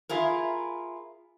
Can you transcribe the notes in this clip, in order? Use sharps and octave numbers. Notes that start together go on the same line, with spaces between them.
E4 F4 G#4 A#4